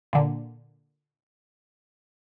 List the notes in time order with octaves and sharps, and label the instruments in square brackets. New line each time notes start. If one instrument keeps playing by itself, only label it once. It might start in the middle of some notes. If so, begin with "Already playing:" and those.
[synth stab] A#2 D3